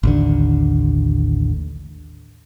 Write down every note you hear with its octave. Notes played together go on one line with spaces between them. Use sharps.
A1 D#2 D3